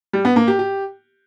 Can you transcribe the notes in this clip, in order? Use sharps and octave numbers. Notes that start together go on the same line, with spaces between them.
G3
B3
A#3
G4
G4